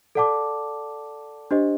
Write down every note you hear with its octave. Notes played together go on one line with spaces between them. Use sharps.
A4 D5 F#5 A5 D6
D4 G4 C5 D#5